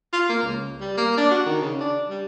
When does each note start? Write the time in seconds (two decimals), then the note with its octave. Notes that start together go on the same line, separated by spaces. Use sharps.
0.13 F4
0.29 A#3
0.43 C#2
0.81 G3
0.97 A#3
1.17 D4
1.31 F#4
1.46 D#3
1.61 C#3
1.80 D4
2.10 G3